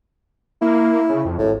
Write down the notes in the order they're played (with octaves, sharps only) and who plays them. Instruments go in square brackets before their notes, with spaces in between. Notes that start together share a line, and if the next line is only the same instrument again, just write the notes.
[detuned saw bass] A#3 [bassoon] E4
[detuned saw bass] C#3
F2
[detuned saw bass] G#1 [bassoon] A2